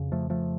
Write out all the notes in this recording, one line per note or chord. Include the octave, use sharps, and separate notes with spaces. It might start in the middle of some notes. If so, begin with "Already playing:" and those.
Already playing: F2 C#3
F3 A3
F3 A3